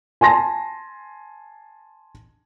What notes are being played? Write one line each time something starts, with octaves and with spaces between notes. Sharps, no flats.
G#5 A5 C6 A#6